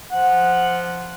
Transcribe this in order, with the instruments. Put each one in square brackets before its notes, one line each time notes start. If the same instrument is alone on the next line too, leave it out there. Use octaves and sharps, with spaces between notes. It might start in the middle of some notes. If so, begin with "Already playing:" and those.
[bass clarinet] F3 [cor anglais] F#5